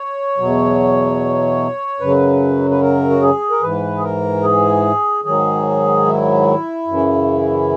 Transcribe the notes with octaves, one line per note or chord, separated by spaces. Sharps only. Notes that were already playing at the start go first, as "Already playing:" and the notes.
Already playing: C#5
E2 B2 F#3
F#2 C#3 F#3 B4
B4
A#4
F#4
G#4
A#4
G#2 E3 B4
G#4
A#4
G#4
G#2 D#3 F#3 G#4
E4
F#2 C#3 E3